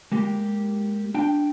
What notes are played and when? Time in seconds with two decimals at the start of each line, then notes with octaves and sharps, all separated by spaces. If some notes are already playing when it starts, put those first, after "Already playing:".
0.12 G#3 A#3 G4
1.14 D4 G5